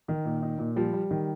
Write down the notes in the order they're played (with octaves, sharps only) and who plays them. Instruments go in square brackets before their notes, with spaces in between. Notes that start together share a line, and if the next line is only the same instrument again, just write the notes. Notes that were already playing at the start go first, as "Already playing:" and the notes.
[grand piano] D#3 [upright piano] D#4
[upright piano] A#2
D#4
A#2
[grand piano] F3 [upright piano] G3
[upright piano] G3
[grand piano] D#3